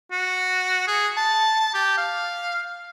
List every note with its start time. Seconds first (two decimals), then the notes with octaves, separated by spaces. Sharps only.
0.12 F#4
0.88 G#4
1.17 A5
1.74 G4
1.98 F5